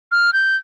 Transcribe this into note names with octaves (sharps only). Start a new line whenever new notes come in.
F6
G6